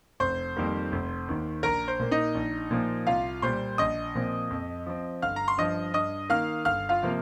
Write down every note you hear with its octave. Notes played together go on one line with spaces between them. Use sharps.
F1 C5 C6
F2 D#3 G3 A#3
F1
D#2 D#3
A#1 A#4 A#5
C5
A#2 A#3
D#4 D#5
A#1
A#2 F3 A#3
C2 F4 F5
A#2 G3 A#3 C5 C6
A#1 D#5 D#6
A#2 F3 C4
F2
F3 C4
G1 F5 F6
A#5
C6
G2 F3 D#5 D#6
G2 D#5 D#6
D#3 A#3 F5 F6
G1 F5 F6
F4 F5
C3 F3 A#3